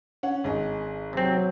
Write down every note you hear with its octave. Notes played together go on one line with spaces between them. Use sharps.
C#4 F#5
G#1 G#4 D#5
C3 F#3 C4